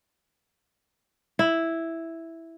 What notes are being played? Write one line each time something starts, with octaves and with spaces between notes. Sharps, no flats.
E4